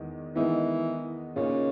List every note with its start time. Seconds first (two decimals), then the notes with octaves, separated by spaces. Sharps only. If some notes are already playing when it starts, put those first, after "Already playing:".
Already playing: E2 D#3 G#3
0.35 D#3 E3 G#3 B3 D#4
1.36 A#2 C#3 A#3 D#4